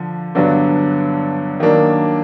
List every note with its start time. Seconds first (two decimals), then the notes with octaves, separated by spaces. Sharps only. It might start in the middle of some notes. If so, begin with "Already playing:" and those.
Already playing: D3 F3
0.35 G2 D3 F#3 B3 D4
1.60 D#3 F#3 A#3 D4